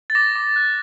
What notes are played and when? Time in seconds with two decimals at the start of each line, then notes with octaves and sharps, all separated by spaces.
0.10 A6
0.15 D6 A#6
0.35 D6
0.56 F#6